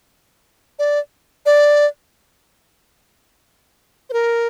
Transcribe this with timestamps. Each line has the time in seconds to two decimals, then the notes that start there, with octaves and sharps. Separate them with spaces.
0.79 D5
1.46 D5
4.10 C5
4.13 A#4